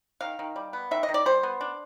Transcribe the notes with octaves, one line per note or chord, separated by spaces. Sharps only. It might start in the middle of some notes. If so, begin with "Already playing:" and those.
D#3 F5
D#3
G3
B3
D#3 E5
D#5
D#3
D5
G3 C5
B3
D4